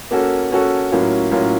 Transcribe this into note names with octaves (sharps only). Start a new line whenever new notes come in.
A#3 C#4 F#4 A4
A#3 C#4 F#4 A4
A2 F#3 A#3 C#4 F4
A2 F#3 A#3 C#4 F4